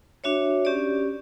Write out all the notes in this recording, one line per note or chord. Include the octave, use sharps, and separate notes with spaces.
D4 F#4 C#5 E5
C#4 G4 D5